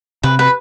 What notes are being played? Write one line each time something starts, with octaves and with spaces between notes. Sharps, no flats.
C3 B4
B4